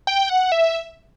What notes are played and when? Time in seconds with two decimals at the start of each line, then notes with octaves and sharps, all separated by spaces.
0.07 G5
0.29 F#5
0.52 E5